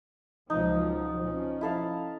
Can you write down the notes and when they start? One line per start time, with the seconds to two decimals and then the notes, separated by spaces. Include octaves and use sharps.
0.50 C#2 F3 F#3 D#4
1.22 F3 C#4
1.61 E4 A4 F5